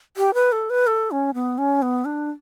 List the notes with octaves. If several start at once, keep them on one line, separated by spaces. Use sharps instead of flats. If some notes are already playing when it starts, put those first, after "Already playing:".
G4
B4
A4
B4
A4
C#4
B3
C#4
B3
D4